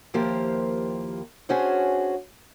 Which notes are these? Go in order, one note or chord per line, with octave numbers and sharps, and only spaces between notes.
D#2 F3 A#3 E4 G4 C5
C#4 D4 F#4 G#4 C5 C#5